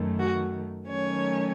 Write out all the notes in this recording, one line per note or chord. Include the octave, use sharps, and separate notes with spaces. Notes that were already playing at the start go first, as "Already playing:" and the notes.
Already playing: F#2 D#3 A3
F#4
D#3 F#3 A3 C#4 C#5